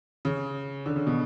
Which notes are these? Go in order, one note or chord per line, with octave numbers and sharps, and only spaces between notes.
C#3
D3
C#3
B2